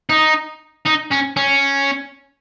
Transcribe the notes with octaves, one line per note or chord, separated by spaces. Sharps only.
D#4
D#4
C#4
C#4